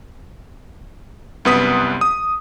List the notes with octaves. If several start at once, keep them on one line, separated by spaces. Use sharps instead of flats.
C2 F#2 B3 B4 D#6 B6
D#6